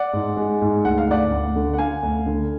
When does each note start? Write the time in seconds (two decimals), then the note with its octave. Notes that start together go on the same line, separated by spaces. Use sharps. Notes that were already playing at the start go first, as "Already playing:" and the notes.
Already playing: D5 F#5
0.13 G#2
0.37 G#3
0.61 G#2
0.85 D2 F#5
0.98 F5
1.08 D2 D5 F#5
1.32 D2
1.56 D3
1.74 F#5
1.78 D3 F5 G#5
2.03 D2
2.26 D3